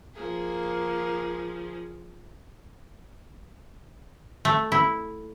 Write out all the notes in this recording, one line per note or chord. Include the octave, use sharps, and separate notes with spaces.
F3 A#3 G#4
A3
E4